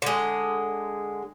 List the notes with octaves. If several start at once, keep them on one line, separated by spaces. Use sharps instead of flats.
D3 G#3